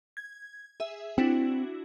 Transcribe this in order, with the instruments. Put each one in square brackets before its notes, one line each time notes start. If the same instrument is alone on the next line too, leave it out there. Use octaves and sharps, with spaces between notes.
[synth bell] G#6
G#4 E5
[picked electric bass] C4 [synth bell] D4 E4 F#4